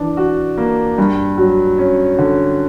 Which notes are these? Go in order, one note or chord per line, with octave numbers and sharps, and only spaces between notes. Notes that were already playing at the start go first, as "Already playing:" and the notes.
Already playing: E3 D4
F#4
A#3
G2
F#3
C#4
D3